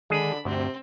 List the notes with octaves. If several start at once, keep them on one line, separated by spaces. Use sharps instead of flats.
D3 D#3 G#3 D4 G#4 B5
D2 G2 C3 C4